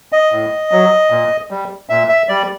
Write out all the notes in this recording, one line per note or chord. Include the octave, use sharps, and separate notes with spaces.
D#5
A2
F#3
A#2
G3
A#2 E5
E5
G3 D5